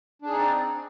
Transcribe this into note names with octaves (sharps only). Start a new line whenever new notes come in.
C4 D4 D#4 G#4 D5